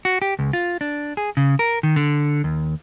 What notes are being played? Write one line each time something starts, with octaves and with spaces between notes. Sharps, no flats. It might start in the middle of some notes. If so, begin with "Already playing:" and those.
F#4
G4
C#2
F4
D4
G#4
C#3
A#4
D#3
D3
D#2